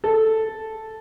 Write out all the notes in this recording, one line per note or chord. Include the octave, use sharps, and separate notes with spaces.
A4